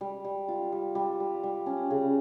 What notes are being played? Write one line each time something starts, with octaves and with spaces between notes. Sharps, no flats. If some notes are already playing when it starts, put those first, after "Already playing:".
G3
G3
F4
G3
G3
G3
G3
C#4
C#3